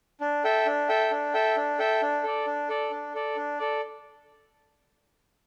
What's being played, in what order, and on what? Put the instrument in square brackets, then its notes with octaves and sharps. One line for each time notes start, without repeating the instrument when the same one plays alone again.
[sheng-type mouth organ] D4
A4 E5 G5
D4
A4 E5 G5
D4
A4 E5 G5
D4
A4 E5 G5
D4
A4 D5
D4
A4 D5
D4
A4 D5
D4
A4 D5